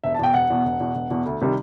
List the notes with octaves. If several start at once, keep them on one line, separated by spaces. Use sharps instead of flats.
E1 E5
A5
E2 B2 G5
E1 F#5
E2 B2
E1
E2 B2
E1
E2 B2
D2
C3 D#3 G3